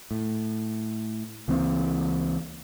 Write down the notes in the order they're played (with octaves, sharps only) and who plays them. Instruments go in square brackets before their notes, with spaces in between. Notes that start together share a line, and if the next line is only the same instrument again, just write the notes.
[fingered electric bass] A2
C#2 E3 A#3 C4